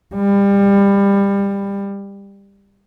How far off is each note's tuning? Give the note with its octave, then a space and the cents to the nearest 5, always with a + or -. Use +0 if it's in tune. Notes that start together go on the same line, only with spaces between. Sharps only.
G3 +25